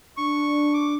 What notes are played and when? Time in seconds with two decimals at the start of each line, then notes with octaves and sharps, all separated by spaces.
0.17 D4 C#6
0.74 D6